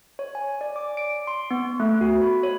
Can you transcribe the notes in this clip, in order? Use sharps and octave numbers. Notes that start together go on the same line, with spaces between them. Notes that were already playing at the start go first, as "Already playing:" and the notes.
C#5
G#5
D5
D6
D7
C6
B3
A3
F#4
B5
C#5